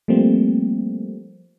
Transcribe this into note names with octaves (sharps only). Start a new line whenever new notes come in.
F3 G3 A3 A#3 C4